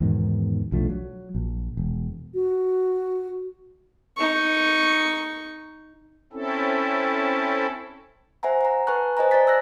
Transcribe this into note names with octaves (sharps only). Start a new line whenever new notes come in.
E2 G#2 B2 D#3
B1 F3 A3 D4
F#3
A#1
E1
F#4
D#4 C#6
C4 C#4 E4 A4
C5 E5 F#5 G#5 A#5
F#5 A#5
B4 G#5 A5 C#6 F#6
C5 D#5 G#5 A#5
C5 D5 G#5 A5 A6 B6
E6 F#6 A#6